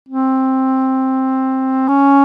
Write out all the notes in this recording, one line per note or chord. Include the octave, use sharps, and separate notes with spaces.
C4
C#4